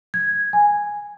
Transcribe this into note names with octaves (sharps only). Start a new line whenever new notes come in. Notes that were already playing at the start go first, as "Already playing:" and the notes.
G#6
G#5